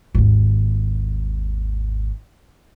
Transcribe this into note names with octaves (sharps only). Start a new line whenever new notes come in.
G#1 D#2